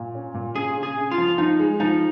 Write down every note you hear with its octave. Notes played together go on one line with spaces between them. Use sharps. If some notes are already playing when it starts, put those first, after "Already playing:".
Already playing: A#2
C#4
A#2
C#3 G#4
C#3
G#4
C#3
F4
F3
F3 D#4
G#3
F3 D#4